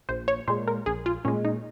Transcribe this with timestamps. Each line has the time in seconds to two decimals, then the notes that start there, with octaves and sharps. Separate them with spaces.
0.09 A#1 C5
0.28 C#5
0.48 A#2 G#3 C5
0.67 A#4
0.86 A#1 G#4
1.06 F4
1.25 A#2 G#3 C#4
1.45 D#4